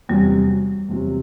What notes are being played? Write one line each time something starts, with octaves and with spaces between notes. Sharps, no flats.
E2 C3 F#3 G3
E2 C3 F#3